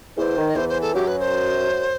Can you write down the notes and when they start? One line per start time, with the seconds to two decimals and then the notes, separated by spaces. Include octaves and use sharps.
0.17 E2 E3 C5
0.37 D#3
0.50 D#5
0.55 E2 E3 C5
0.69 C5
0.81 A4
0.94 F#2 F#3 G4
1.07 B4
1.20 C5